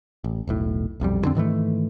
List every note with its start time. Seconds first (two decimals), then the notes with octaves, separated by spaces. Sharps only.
0.24 A1
0.47 E1 B1 A2
1.00 D#1 B1 F2 G3
1.23 F2 D3 C4
1.35 G#2 D#3 E3 A3